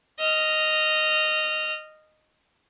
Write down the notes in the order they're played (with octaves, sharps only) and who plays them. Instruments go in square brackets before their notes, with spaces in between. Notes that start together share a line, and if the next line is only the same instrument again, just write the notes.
[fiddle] D#5 F6